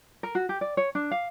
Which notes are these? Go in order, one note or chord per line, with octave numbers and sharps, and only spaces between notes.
A#4
F#4
G4
D5
C#5
D4
F5